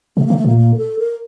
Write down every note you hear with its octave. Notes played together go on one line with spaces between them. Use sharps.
C3 A3
D3 A#3
A3
A#2 A#3
A#3
A#4
A4
A#4